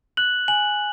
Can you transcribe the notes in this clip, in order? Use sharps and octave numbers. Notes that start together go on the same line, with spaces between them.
F#6 F#7
G#5 F#7